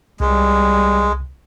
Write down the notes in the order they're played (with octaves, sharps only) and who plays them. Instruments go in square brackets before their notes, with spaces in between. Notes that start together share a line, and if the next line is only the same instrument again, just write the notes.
[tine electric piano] C2 [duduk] G3 [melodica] G#3